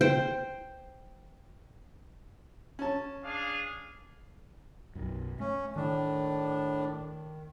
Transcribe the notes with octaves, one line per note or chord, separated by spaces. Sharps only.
C5 G5
C#4 A5
D4 G#4 F5
B1 F#2
A3 C#4
A2 D#3 D4